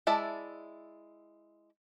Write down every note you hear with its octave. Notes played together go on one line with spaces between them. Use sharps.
G#3 E4 D5 E5 A5